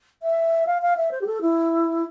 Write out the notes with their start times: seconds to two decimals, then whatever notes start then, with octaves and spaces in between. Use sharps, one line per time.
0.23 E5
0.67 F5
0.82 F5
0.97 E5
1.11 C5
1.21 G4
1.27 A4
1.41 E4